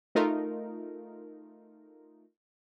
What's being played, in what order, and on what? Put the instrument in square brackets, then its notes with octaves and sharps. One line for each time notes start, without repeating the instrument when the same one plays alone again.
[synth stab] A3 D#4 F4 A#4